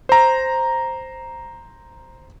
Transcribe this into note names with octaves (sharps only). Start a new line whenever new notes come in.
C5 A#5